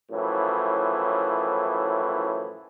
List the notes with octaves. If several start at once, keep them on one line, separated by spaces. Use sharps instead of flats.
F#2 A2 E3 F3